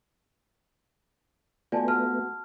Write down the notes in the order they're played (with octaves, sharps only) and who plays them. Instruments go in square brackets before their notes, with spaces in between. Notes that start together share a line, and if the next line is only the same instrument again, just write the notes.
[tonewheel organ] A3 B3 [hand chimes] F4 F#4 [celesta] D5 G#5 A5
[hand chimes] F#4 [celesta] A5 F6